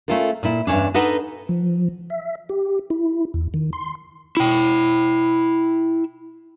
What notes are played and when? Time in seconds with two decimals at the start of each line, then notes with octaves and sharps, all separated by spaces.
0.08 A3 C#4 F4 A4 A#4
0.43 A#2 E4
0.67 E2 G2 D#3 C#4 D4
0.94 D4 D#4 A4 B4 D#5 F#5
1.49 F3
2.10 E5
2.49 G4
2.90 E4
3.34 E2
3.54 D#3
3.73 C6
4.37 E4 G5